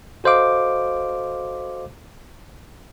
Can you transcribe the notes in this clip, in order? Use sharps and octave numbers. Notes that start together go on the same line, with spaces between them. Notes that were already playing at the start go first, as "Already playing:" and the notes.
F#4 A4 C5 D#5 F5 D6